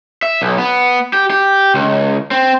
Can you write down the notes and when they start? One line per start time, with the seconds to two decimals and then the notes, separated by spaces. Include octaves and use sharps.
0.23 E5
0.42 B1
0.58 B3
1.13 G4
1.30 G4
1.74 C#2
2.31 C4